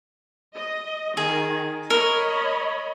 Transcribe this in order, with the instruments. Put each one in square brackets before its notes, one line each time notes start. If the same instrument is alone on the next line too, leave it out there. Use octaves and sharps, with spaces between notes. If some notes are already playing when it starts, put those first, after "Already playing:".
[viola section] D#5
[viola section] D#3 [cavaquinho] G#4
[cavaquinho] A#4 [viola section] C#5 D#5 B5